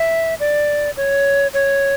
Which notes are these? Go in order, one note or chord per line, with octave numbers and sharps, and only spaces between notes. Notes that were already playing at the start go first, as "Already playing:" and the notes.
Already playing: E5
D5
C#5
C#5